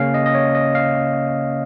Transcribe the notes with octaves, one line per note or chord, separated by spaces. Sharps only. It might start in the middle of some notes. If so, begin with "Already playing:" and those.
Already playing: C#3 A#3 C#4 F5
D#5
D#5
C#5
D#5
F5